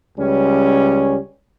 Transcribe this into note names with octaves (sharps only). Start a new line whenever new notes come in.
C#2 G3 C#4